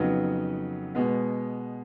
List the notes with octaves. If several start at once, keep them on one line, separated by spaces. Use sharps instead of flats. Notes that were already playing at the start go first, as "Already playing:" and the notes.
Already playing: F2 C#3 F#3 B3 D#4
B2 G#3 B3